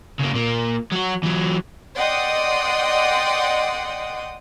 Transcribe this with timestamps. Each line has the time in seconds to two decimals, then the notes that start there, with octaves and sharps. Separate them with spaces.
0.19 C#3 A#3
0.34 A#2 A#3
0.92 F#3 F#4
1.23 E3 F#3
1.96 D5 D#5 F#5 G5 C6 D#6